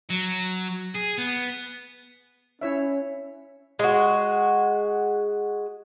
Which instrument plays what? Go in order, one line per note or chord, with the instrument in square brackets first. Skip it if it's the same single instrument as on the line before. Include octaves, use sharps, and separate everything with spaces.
[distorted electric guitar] F#3
G#4
B3
[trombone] C#4 [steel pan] E4 C#5 E5
[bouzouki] G#3 F#4